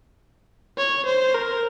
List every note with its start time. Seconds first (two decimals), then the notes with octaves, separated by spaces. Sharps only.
0.77 C#5
1.06 C5
1.34 A#4